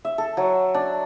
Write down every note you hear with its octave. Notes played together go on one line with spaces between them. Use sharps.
E5
A4
F#3
D4